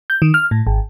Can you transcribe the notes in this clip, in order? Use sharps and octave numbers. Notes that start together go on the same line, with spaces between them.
G6
D#3
F6
A2
G#1